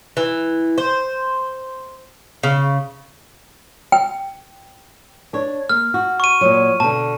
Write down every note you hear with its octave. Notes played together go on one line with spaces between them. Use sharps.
E3
C5
C#3
G5
D4 C#5
A#3 F6
F#4
C#6 D#7
A#2 F#3
B2 D3 A5